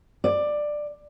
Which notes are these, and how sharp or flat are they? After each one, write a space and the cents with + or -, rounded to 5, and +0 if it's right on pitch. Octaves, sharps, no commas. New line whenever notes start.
D5 +15